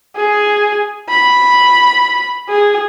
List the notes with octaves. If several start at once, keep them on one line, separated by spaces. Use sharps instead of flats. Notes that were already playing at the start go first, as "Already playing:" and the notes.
G#4
B5
G#4